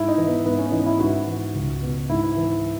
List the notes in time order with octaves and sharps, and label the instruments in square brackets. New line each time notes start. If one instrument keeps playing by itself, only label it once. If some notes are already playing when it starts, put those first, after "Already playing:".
Already playing: [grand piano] G#2 E4
D#4
E3
B3
G#2 B3
C#4
E3 D#4
E4
G#2 F#4
E3
C#2
B2
G#2 E4
E3